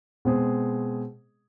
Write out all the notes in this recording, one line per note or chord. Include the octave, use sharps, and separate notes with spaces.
B2 G#3 C4 G#4